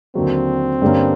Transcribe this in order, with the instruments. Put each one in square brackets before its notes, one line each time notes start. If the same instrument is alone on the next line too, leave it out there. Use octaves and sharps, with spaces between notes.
[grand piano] D#2 D3 F#3 [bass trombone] C4
[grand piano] G2 D3 G3 A#3 C#4